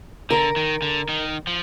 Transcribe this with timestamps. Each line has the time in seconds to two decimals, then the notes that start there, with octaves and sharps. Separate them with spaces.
0.30 D3 A#4
0.56 D#3
0.82 D3
1.09 D#3
1.47 F3